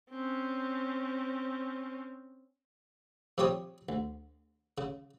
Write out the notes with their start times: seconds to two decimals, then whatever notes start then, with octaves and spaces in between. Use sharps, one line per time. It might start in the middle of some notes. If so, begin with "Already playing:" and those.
0.10 C4 C#4
3.38 C3 F3 G3 G4 C#5 D#6
3.89 D2
4.78 C#3